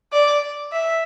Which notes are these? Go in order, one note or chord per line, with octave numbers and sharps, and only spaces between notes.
D5
E5